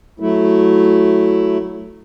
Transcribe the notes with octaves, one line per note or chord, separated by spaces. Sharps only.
F#3 A3 E4